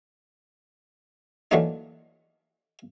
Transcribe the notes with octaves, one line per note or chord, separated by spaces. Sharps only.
D3 E3 F#3 A3 A#3 D#4